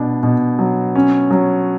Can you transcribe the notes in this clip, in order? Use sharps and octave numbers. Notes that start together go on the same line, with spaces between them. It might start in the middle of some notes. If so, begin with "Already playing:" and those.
Already playing: B2 D4
B2
F#3
C#4
F#3